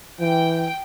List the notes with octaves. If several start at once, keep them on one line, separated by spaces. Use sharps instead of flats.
E3 G5